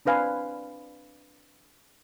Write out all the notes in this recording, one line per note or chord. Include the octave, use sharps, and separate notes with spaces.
C4 D4 B4 F5 G#5